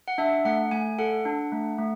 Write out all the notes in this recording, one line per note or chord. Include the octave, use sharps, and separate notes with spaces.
F#5
D4 E5
A3 F#5
A3 G#5
A4 F#5
D4
A3
A3